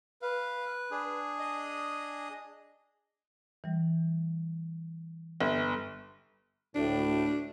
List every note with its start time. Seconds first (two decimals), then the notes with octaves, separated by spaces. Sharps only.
0.22 B4 F5
0.91 D4 G#4
1.39 D#5
3.64 E3 G3
5.41 G1 G#6
6.75 D2 A2 D4